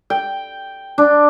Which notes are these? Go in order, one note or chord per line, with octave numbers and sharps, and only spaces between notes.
G5
D4